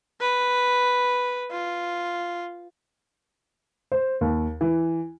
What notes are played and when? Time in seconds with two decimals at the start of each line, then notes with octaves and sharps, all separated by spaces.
0.21 B4
1.52 F4
3.92 C5
4.21 D#2
4.61 E3